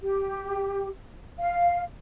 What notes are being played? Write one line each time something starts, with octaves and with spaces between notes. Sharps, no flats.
G4
F5